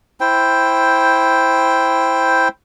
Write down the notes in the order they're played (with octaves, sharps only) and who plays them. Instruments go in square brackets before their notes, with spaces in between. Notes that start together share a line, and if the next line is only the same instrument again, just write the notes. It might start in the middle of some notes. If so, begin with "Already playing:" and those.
[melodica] E4 C5 G5